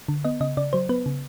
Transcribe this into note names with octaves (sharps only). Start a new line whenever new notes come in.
D3
B3 D#5
C#3 D#5
C#3 D5
F#3 C5
B3 B4
C#3